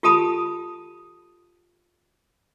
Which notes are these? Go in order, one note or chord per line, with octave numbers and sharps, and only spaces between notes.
F4 G4 A4 A5 B5 D#6